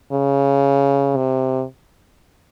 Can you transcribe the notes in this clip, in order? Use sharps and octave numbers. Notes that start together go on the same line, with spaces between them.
C#3
C3